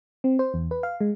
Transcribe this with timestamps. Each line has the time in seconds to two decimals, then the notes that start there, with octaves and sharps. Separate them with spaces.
0.24 C4
0.39 C5
0.54 E2
0.71 B4
0.83 F5
1.01 G#3